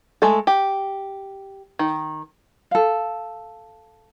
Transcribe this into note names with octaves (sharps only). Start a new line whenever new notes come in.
G#3 A3 A4
G4
D#3
A4 F5